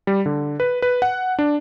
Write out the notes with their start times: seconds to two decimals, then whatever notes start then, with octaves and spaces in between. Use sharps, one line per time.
0.07 G3
0.26 D3
0.60 B4
0.82 B4
1.02 F#5
1.39 D4